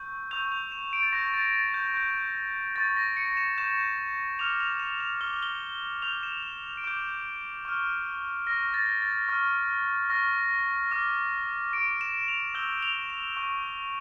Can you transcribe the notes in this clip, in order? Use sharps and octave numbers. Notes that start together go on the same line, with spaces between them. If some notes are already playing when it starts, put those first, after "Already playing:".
Already playing: C#6 E6 G6
C#6 E6 G6 F7
F7
E7
D7
A6
C#6 G6 A#6
A6
A6
G6
C#6 G6
C#6 G6 A6
A#6
C#7
E7
C#6 G6 E7
D6 F6 F7
F7
E7
F7
D6 F6 G7
G7
D6 G6 F7
E7
F7
F7
D7
D6 G6 E7
C#6 F6
C#6 F6 A#6
A6
A6
C#6 F6
C#6 F6 A#6
D6 F6
D6 F6 D7
E7
F7
C#6 E6 G6 G7
F7
E7
C#6 E6 G6